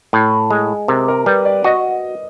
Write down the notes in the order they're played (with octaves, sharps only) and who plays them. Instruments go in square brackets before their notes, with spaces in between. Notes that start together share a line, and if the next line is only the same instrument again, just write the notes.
[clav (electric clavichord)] A2
G#3
[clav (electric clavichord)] C3 [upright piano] A#4
[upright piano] A#4
[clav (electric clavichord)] G3 [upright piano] B4
[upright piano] D5
[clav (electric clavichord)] F#4 [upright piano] D#5